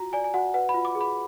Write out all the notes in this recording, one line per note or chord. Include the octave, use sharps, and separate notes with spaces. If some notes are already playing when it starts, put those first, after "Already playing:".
Already playing: F4 F#4 A#5
D5 G#5
G#5
F#4 F#5
B4 F#5
B5
F4
D6
G#4
B5